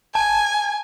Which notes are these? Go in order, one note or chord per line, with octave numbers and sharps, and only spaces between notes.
G#5 A5